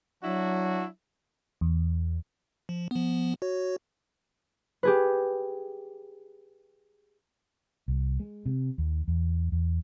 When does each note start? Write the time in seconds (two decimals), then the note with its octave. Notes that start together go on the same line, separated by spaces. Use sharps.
0.23 F#3 D4 E4 F#4
1.61 E2
2.69 F3
2.91 F3 B3
3.42 F#4 C#5
4.83 G4 G#4 B4
7.88 C2
8.20 G#3
8.46 C3
8.78 D#2
9.08 E2
9.52 E2